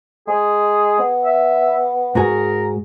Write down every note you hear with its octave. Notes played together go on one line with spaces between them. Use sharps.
G#3 G#4
B3
E5
G#2 F#4 G#4 A#4